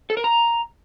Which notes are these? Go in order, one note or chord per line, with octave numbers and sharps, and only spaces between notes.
A4
A#4
A#5